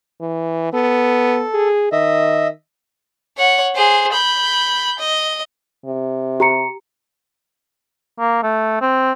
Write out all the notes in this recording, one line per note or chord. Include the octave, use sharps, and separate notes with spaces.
E3
B3 A4
G#4
D#3 D#5 E5
C#5 F#5
G#4 C5
B5 G6
D#5
C3
G4 A#5 C#7
A#3
A3
C4